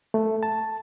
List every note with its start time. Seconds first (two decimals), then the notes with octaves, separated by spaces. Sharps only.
0.14 A3
0.43 A5